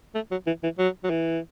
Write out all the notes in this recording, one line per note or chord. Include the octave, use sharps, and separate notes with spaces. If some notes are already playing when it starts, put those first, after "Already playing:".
A3
F#3
E3
E3
F#3
F#3
E3